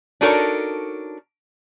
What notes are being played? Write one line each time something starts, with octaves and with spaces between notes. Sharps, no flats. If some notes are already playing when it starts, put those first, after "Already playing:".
D4 D#4 F#4 A4 A#4 C#5